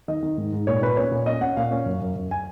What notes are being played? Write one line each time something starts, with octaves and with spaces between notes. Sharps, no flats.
D#3 D#5
D#3
G#2
G#2
A#2 C#5
A#2 B4
C#4 C#5
A#2
C#4 D#5
C#4 F#5
A#2 F5
C#4
F#2
F#2
F#2
G#5